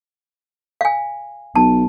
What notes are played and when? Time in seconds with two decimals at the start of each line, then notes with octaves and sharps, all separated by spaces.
0.81 F5 G#5
1.56 B1 A5